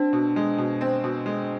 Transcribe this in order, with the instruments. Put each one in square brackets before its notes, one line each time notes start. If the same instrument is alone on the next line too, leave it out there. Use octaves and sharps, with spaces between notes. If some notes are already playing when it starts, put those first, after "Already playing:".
Already playing: [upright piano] C4 [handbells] D4
[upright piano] B2
G#3
B2
C4
B2
G#3